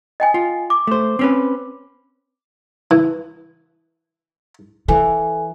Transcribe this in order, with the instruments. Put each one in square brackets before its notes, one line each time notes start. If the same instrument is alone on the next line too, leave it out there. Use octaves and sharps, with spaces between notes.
[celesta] D#5 G5 G#5
[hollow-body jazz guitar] F4
[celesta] D6
[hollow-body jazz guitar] A3 C5
C4 C#4 B4
[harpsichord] E3
[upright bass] E3 [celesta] A4 G#5